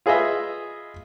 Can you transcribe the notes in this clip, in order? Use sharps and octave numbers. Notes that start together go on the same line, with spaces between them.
F4 G#4 B4 D#5 E5